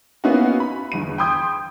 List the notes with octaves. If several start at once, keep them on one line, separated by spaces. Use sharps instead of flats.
A#3 B3 C#4 D#4 E4 F#4
B5
G1 E2 D#7
G5 B5 C6 D#6 G6 G#6